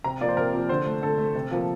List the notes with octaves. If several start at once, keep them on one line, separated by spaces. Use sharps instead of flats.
C3 A#5
F3 A#3 D5
C5
C3 A#4
F3 A#3
D3 C5
A3
D3 A4
A3
C3
F3 A#3